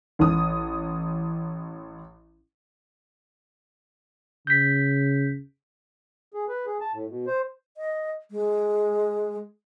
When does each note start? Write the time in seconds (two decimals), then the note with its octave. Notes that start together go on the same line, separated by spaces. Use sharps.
0.19 A1 D#6
4.47 C#3 G6 B6
6.34 G#4
6.49 B4
6.66 G#4
6.81 A5
6.93 A2
7.09 B2
7.27 C5
7.77 D#5
8.31 G#3